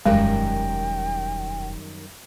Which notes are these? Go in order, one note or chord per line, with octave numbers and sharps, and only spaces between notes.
E1 F#2 D#3 G3 G#3 G5